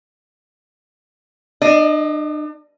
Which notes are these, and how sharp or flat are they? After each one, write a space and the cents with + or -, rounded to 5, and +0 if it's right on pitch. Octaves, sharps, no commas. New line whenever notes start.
D4 +40 D#5 +10